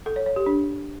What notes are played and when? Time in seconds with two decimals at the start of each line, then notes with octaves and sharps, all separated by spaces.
0.06 A4
0.16 C#5
0.26 C#5
0.36 G4
0.46 D4